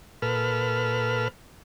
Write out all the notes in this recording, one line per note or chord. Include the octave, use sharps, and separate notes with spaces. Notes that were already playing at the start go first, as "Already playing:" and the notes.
A#2 A4 B4 F6